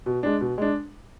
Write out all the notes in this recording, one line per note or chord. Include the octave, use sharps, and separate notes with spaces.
B2
G#3 D4
B2
G#3 D4